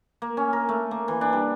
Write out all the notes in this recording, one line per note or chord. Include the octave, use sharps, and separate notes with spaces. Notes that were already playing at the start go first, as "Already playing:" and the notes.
A#3
C#4
A#4
A3
A#3
E3
D4
G3